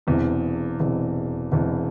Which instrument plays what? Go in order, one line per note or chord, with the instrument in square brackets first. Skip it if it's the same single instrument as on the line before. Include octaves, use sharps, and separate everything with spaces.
[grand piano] E1 E2 C3
E1 E2 C3
E1 E2 C3